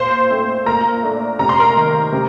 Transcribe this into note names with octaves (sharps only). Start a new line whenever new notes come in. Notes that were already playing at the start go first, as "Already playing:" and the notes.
Already playing: A#2 C5 C6
A3 C4
A#2 A#4 A#5
A3 D4
C3 A#5
C6
A#4 A#5
D#3 A#3
C3